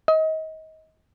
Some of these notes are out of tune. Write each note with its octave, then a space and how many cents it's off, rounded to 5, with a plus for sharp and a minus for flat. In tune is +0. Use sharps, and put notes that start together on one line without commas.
D#5 +30